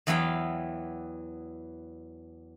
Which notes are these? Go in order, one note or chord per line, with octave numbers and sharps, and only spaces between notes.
E2 E3 F#3 B3 F5 G5